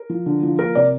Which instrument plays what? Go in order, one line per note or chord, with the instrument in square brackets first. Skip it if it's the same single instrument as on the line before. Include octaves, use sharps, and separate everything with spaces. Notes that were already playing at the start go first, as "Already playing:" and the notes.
Already playing: [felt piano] A#4
F3
D3
F3
A#3 A#4
C3 D5